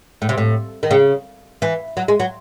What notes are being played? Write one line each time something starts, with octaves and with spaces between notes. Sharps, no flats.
A2
C3
A2
D#3
C#3
E3
F#3
G#3
F#3